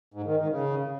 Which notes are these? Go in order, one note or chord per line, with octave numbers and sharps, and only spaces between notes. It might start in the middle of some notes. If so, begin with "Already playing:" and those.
G#2
D#3
D#3
C#3